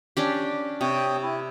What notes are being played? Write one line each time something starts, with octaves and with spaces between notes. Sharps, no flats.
C#4 D4 G4
C3 C#5 G5 D#6
E4